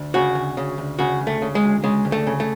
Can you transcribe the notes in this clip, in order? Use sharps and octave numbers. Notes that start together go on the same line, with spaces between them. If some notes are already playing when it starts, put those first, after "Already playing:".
Already playing: D2
C#3 F#4
D2
C#3
D2
C#3 F#4
D2
A3
C#3
G#3
D2
C#3 G#3
D2
A3
C#3
A3